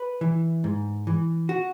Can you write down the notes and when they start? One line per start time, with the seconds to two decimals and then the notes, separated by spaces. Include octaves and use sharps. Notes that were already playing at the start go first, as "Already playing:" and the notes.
Already playing: B4
0.21 E3
0.64 G#2
1.07 E3
1.49 F#4